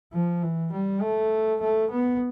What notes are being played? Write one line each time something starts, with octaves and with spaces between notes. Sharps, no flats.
F3
E3
G3
A3
A3
B3